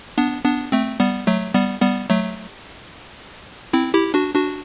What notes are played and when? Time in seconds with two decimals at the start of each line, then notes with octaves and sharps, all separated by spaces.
0.18 B3 D4
0.45 B3 D4
0.72 A3 C4
1.00 G3 B3
1.27 F#3 A3
1.54 G3 B3
1.82 G3 B3
2.10 F#3 A3
3.73 C4 E4
3.94 E4 G4
4.14 D4 F#4
4.35 D4 F#4